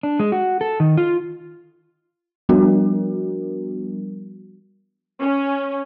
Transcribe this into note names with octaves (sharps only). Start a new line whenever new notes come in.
D4
G#3
F#4
A4
D#3
F4
F3 G3 B3 D4 F#4 A#4
C#4